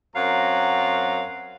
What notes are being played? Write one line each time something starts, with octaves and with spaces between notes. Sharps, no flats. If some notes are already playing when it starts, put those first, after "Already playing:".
F#2 C4 F5 F#5 A#5